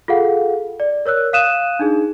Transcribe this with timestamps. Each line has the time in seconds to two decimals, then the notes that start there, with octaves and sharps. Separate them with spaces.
0.08 F4 G#4 A4 F5 F#5
0.80 D5
1.06 A#4 C#5 E6 F#6
1.33 F5 D#6 F#6 D#7 E7
1.79 D4 D#4 G#4